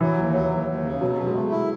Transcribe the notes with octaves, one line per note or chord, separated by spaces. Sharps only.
E3 F#3
D#2
F#3
D#2
D#2
C#3
B2 F#3
B2
G#3
A3
E4